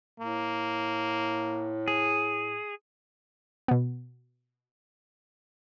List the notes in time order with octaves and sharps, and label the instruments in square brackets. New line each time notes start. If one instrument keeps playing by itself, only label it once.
[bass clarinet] A2 [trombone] A#3
[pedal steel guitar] G#4
[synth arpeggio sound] B2 B3